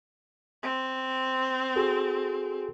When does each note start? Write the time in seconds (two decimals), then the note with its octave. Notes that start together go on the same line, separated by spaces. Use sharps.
0.63 C4
1.76 F#4 G#4 A4